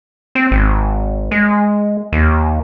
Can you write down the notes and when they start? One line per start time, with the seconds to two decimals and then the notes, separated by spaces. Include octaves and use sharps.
0.35 C4
0.51 G#1
1.31 G#3
2.13 D#2